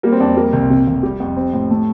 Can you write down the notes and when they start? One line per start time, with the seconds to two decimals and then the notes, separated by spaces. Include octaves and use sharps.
0.03 G3 A#3 A#4
0.12 C4 C5
0.20 F2 D4 D5
0.36 G3 A#3 A#4
0.53 C2
0.70 C3
0.87 F1
1.03 G3 G4
1.20 F2
1.37 C4
1.53 A2
1.70 A3